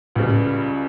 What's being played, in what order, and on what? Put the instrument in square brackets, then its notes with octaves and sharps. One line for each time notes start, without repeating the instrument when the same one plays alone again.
[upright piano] C#2 C#3 G3 [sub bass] A2